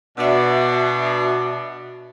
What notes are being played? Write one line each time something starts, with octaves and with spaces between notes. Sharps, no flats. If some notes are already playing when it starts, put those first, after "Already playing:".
B2 D4 F#4 E5